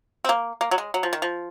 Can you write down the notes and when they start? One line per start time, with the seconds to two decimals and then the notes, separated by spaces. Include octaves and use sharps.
0.25 C4
0.29 A#3
0.61 A#3
0.71 F#3
0.78 G#3
0.94 F#3
1.03 F3
1.13 D#3
1.22 F3